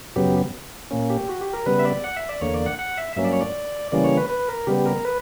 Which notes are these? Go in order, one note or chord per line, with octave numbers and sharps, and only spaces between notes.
F#2 C#3 F#3 B3 G4
A#2 A#3 C#4
G4
F#4
G4
A#4
C#3 G3 B3 B4
E5
D5
F#5
E5
D5
E2 D3 A#3 C#5
D5
F#5
F#5
E5
G2 F#3 A#3 C#4 E5
D5
C#5
D5
C#3 E3 G3 A#3 C#4 D5
C#5
B4
B4
A#4
C#3 G3 B3 G4
A#4
B4